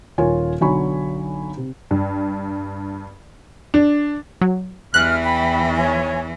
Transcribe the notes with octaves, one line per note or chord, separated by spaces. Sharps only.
D#1 F4 A#4 C#5 G#5
B1 D3 F#3 G#5 B5 C#6
C3
G2
D4
F#3
E2 G2 E3 G#3 F6 F#6
G5 B5
C#5 G#5